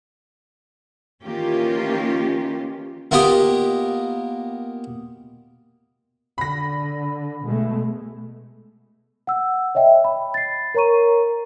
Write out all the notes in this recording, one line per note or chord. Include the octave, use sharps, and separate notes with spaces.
D#3 E3 A#3 C#4 F4 G4
A#3 B3 F4 G4 D#5
D3 B5 A#6
B2 G#3 A3
F#5 E6
C#5 D#5 E5 G5
B5
A6 C7
A#4 C#5 A#5 C#6 D#7